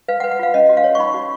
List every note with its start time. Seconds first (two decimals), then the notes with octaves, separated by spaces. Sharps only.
0.08 B4 F5
0.20 F#5
0.24 B4
0.31 F#5
0.39 F4 F5
0.54 C#4 D#5
0.69 F#4
0.77 F5
0.84 C#5
0.95 C#6
0.99 D#4 B5
1.14 F#4